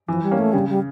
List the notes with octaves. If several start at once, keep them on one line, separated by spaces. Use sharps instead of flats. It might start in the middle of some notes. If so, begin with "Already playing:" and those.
E3 F3
G3
A#3 C#4
A3
C#3 G3
G3